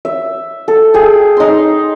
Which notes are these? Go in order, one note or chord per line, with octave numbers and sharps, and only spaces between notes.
E5
A4
G#4 G5
D#4 C6